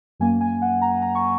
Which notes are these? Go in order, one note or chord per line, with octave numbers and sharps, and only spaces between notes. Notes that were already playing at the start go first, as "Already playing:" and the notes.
F#2 F#3 A#3 G#5
G#5
F#5
A#5
A#5
C#6